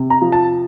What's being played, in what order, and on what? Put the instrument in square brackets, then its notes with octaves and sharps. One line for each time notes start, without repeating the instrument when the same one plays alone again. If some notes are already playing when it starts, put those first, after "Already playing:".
Already playing: [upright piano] C3
A#5
F3
A5